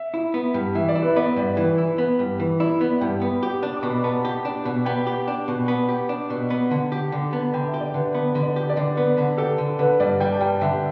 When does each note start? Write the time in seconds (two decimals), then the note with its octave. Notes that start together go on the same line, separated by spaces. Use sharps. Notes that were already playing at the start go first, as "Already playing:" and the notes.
Already playing: E5
0.14 E4
0.34 B3
0.54 G2
0.75 E3 E5
0.89 D5
0.95 E4
1.03 B4
1.16 B3 D5
1.36 G2
1.57 E3 B4
1.78 E4
1.98 B3
2.19 G2
2.39 E3 B4
2.60 E4 D5
2.81 B3 E5
3.01 G2 G5
3.21 B3 B5
3.43 G4
3.63 D4
3.77 D6
3.83 B2
3.90 B5
4.04 B3 A5
4.25 G4
4.45 D4
4.65 B2
4.85 B3 G5
5.07 G4
5.28 D4
5.48 B2
5.68 B3
5.89 G4
6.09 D4
6.30 B2
6.50 B3
6.71 D3
6.92 G4
7.12 D3
7.32 B3 A5
7.54 D3 G5
7.67 E5
7.74 G4
7.80 D5
7.94 D3 B4
8.14 B3 B4
8.35 D3
8.43 D5
8.56 G4
8.70 D5
8.77 D3
8.97 B3 B4
9.18 D3
9.38 G4 A4
9.58 D3
9.79 D3 B4
10.00 G2 D5
10.20 G3 G5
10.32 A5
10.41 G2 G5
10.61 D3 E5